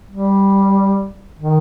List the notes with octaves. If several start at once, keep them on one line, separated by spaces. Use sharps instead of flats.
G3
D#3